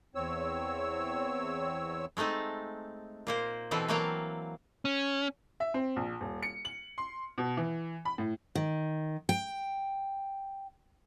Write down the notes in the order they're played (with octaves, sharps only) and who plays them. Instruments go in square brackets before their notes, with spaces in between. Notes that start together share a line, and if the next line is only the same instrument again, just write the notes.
[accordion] E2 C4 C#5 E6
[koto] G#3 A3 C4 D#4 A5
A#2 A#3 C5
B2 E3 C4 A4 B4
E3 F#3 A#3 F5 G5 A5
[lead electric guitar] C#4
[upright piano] E5
C4
A#1
D#1
C#7
F#7
C6
B2
E3
B5
A2
[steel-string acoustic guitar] D#3
G5